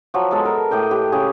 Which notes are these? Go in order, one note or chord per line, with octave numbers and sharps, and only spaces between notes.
F3 F#3
G#3 B3 A4
A#4 E5
A2 D#5 G5 D6
G4 B4
C#3 C#4 G#4 D6